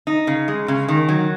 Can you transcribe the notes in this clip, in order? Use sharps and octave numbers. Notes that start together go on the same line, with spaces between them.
D#4
C#3
G#3
C#3
D#3
F#3